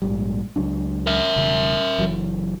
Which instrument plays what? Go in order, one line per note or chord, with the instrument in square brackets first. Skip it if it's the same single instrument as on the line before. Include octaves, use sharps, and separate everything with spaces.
[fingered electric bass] A#1 G#2 G3
C#2 F#3 D4
[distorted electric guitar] A#4 E5
[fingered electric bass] E1 C#3
F#1 E3 F#3